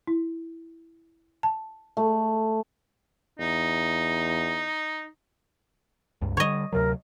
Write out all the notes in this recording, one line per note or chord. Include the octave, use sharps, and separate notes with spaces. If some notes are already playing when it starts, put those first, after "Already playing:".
E4
A5
A3
E2 D#4
C#2 G2
D3 G3 C#5 D#5
D2 C3 F#3 A#4